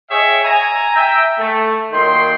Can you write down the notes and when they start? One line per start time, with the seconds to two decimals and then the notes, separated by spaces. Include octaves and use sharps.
0.10 G#4 C#5 D#5 E5 G5 G#5
0.45 G#5 A#5
0.96 E5 G5
1.39 A3
1.92 A#2 D#3 F#3 G5 C6